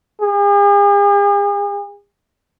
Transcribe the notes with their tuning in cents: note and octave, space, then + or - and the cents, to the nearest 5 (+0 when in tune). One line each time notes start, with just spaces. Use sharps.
G#4 -45